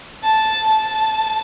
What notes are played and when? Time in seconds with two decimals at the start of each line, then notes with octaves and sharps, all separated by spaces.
0.23 A5
0.67 A5